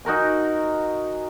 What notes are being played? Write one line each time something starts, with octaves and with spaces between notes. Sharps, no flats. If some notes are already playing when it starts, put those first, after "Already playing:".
D#4 F#4 A#4 G#5